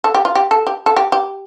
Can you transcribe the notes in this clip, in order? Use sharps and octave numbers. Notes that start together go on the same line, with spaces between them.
A4
G4
F4
G4
A4
G4
A4
G4
G4